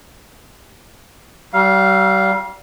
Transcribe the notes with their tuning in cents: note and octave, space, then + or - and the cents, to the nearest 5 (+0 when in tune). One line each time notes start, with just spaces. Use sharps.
G3 -35 F5 +0